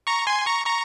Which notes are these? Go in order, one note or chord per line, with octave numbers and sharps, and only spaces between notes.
A#5 C#6
G#5 C6
A#5 C#6
A#5 C#6